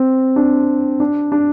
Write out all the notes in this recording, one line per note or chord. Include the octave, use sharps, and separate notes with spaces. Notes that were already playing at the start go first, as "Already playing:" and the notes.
Already playing: C4
D4
D4
D4